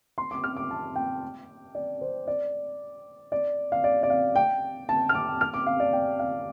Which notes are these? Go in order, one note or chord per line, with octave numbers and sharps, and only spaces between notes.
C6
D6
F6
D6
A5
G5
D5
C5
D5
D5
F5
D5
D5
F5
G5
A5
F6
D6
F6
D6
F5
D5
G5
F5